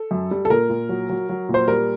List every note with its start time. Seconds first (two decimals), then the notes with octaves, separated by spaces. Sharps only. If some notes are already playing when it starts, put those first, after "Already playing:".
Already playing: A4
0.11 F#2
0.31 G3
0.45 A4
0.50 A#2 A#4
0.70 A#2
0.89 F#3
1.09 F#3
1.29 F#3
1.49 A#2
1.54 C5
1.68 G3 A#4